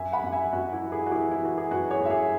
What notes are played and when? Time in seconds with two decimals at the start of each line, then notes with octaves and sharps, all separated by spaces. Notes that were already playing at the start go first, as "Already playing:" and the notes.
Already playing: F#2 E5 G#5
0.13 F#5 B5
0.24 F#2
0.32 E5 G#5
0.53 F#2 F#4
0.72 E4
0.83 E3
0.92 E4 G#4
1.06 F#4
1.12 E3 E4 G#4
1.31 E4
1.41 E3 F#4
1.58 G#4
1.71 F#2 F#4 B4
1.91 G#4 C#5
2.01 F#2 E5
2.10 G#4 C#5